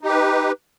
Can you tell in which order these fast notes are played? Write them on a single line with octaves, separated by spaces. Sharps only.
D#4 G4 B4